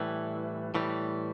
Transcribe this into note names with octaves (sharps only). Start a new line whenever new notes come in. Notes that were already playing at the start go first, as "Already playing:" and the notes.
Already playing: A2 E3 G3
A2 E3 G3